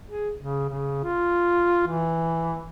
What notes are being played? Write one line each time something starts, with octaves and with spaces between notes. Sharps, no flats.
G#4
C#3
C#3
F4
E3